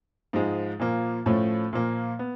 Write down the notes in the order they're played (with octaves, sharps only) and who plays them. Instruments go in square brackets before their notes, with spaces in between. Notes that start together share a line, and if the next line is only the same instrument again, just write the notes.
[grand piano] G#2 F3 G#3
A#2 F3 A#3
A2 F3 A3 C#4
A#2 F3 A#3
B3